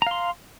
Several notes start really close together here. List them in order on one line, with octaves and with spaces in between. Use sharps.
A#5 F5 C6